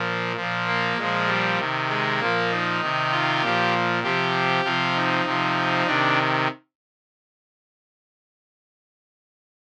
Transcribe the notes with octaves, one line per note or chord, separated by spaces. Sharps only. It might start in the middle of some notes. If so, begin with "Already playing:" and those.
Already playing: A#2 F3
A#2 F3
A#3
A#2 F3 G#3
G3
C3 D#3
G#3
A#2 F3 A#3
D#4
C3 D#3
F4
A#2 F3 G4
C3 F3 G4
C3 F3 F4
D#4
C3 F3
C3 D#3 D4